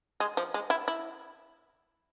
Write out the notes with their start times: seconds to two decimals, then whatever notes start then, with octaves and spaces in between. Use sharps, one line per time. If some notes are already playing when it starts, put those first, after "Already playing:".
0.20 G#3
0.37 F3
0.54 G#3
0.70 E4
0.88 E4